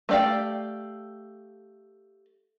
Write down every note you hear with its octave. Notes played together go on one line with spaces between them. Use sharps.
A3 G4 D5 F5 G5